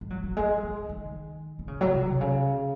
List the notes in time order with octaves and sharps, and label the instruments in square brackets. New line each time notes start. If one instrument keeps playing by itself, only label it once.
[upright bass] G#3
F#3
F#3
G#3
F3
D#3
D#3
C#3
F#3
C3
C3
C#3